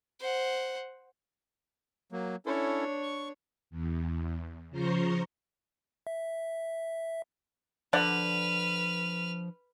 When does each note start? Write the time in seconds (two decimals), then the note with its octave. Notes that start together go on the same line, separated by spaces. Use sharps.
0.20 C5 F#5
2.12 F#3 A#3
2.46 C#4 D4 E4 A4 C#5
3.02 C#6
3.70 E2
4.70 C#3 F3 C5 A#5 C6 C#6
6.07 E5
7.93 D3 F3 B4 D5 F#5 F6